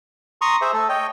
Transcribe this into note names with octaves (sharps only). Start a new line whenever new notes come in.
A#5 C6 C#6 D#6
G#4 C5 E5
A3 A4
C#5 D#5 G5